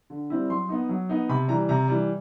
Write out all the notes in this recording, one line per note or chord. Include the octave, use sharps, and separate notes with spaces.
D3
G3 C4 E4
F#3 C6
B3 D#4
F#3
B3 D#4
C3 B5
E3 G3 A#5
C3 A#5
E3 G3